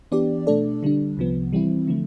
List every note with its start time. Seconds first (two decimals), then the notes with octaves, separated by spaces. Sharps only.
0.12 E3 B3 D4 G4 D5
0.47 B2 A3 D4 A4 D5
0.83 D3 G3 D4
1.17 C2 C3 F3 B3
1.53 E3 G3 C4 E4
1.87 D3 F3 A3